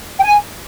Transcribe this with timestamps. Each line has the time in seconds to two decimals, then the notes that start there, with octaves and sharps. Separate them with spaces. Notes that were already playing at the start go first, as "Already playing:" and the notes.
0.18 G5
0.23 G#5